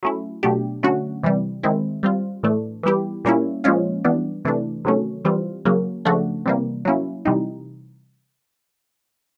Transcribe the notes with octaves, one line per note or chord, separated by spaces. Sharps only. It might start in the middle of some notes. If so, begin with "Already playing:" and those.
F#3 A3 C#4 E4
B2 F#3 A3 D4 G4
D3 F#3 A3 C#4 F#4
C3 E3 G3
D#3 G#3 C4 E4
G3 C4 F4
A2 E3 A3 D4
E3 G3 B3 E4 G4
A#2 G3 A#3 C#4 E4
A#2 F3 G#3 C#4 F4
E3 G3 B3 D4
C3 E3 A3 D4
C3 D#3 F#3 A3 C#4
E3 G3 C4 F4
C#3 F#3 A#3 C#4
C#3 F3 A3 D4 F#4
C3 E3 G3 A#3
F#3 A#3 C#4 E4
C3 E3 G3 C4 D#4